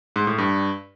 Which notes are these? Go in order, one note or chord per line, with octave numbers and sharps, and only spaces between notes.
G#2
A2
G2